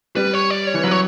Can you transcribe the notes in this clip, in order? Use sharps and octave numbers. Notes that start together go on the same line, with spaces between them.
G3 B4
C#5
D5
C#5
E3
F#3 B4
C#5